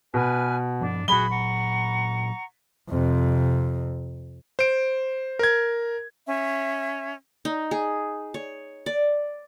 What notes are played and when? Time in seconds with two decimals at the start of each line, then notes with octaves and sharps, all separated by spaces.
0.14 B2 B4 G#5 F6
0.81 G2 F3 D4
1.08 A#2 F#3 F#4 G#4 B5 G7
1.30 F#5 A#5 C#6
2.89 F2 C3
4.59 C5 D7
5.39 A#4 G#6
6.27 C#4 E5
7.45 D#4
7.71 G#4
8.34 C#5
8.86 D5